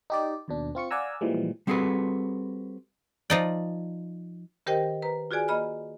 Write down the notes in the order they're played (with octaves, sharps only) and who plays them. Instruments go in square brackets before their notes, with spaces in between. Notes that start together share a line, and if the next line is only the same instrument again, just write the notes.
[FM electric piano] D#4 G4 D5
D#2 B2 D4
C4 F4 C#6 C#7
D5 F5 F#5 G#5 A#5 E6
A#2 E3 F3 G3 G#3
[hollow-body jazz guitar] G3 C4 F#4 G#4 A4 B4
[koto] F3 D#4 D5
[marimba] D#3 G4 A#4 C5 D#5 G5
B4 A#5
F4 F#4 G#4 D5 G#5
A#3 D#5 B5 F6